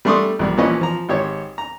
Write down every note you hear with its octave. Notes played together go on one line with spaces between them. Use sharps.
G3 A3 D4 C6 C#6 D#6
A#1 G3
A#2 E3 F3 C#4 B4 D#5
F3 A#5
G#1 G4 C#5
A#5